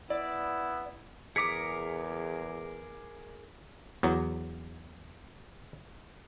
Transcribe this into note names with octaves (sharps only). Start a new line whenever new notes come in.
B3 E4 D5
E2 G#4 A#4 D6 D#6 B6 C#7
E2 F#3